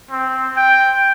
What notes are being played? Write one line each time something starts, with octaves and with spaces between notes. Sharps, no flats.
C4
G5